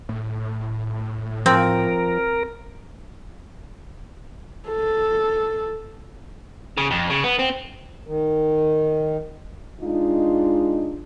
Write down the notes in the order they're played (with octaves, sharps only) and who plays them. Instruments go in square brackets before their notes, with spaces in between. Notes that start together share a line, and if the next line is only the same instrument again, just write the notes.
[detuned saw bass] A2
[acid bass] F3 [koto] C4 [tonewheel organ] A#4
[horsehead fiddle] A4
[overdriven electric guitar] C#3
F2
C#3
B3
C4
[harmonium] D#3
[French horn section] G#3 D4 D#4 F4